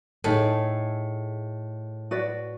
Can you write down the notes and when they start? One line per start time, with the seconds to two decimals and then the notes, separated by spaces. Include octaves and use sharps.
0.24 A2 A3 D#4 G#4 A4
2.11 F#4 B4 D5